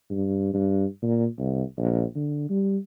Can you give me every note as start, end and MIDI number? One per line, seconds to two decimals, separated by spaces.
0.11 0.52 43
0.53 0.85 43
1.03 1.26 46
1.38 1.63 36
1.78 2.03 34
2.15 2.46 50
2.50 2.77 55